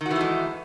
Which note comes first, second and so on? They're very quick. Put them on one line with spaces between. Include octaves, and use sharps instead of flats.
D#3 F#4 E3 A3 G#3